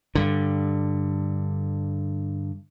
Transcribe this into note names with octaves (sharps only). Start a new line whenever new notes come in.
G2 D3